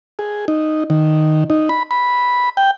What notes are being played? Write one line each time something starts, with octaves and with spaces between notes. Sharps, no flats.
G#4
D#4
D#3
D#4
B5
B5
G5